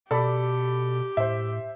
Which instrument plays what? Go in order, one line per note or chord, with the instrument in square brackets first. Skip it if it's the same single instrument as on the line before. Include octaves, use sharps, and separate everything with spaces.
[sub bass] B2 [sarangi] G4 [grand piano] A4 D5 B5
[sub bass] A2 [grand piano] C5 E5